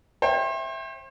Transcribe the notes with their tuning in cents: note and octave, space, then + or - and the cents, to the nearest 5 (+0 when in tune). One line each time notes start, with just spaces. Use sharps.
C5 +40 E5 +0 G5 +0